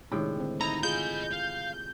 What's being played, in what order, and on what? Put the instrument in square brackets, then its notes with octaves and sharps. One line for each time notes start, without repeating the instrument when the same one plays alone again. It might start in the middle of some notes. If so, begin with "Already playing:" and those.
[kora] A2 C3 G5 [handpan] D#3 G#3 D4
[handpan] D3 C4
[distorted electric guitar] D#4 [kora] E4 [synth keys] A#5
[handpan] F4 G#4 [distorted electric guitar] D#5 B5 [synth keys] G6
[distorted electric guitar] F5